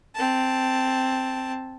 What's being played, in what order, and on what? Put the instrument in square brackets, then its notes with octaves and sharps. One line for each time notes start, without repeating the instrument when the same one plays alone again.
[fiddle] C4 A5